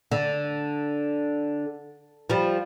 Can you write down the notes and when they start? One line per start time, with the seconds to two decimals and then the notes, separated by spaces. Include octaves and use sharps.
0.11 D3
2.30 F3 G3